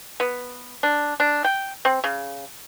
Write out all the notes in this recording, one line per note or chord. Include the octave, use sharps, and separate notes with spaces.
B3
D4
D4
G5
C4
C#3